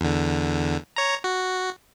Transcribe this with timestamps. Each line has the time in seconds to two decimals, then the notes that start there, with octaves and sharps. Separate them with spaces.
0.01 E2 D3
0.96 C#5 A#5
1.24 F#4